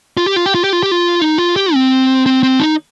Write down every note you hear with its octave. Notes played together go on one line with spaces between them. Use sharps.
F4
G4
F4
G4
F4
G4
F4
G4
F4
D#4
F4
G4
C4
C4
C4
D#4